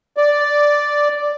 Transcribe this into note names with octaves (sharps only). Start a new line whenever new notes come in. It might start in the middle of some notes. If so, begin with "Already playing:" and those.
D5